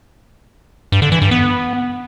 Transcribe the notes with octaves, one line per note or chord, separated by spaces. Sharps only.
G2
D3
E3
G2
B3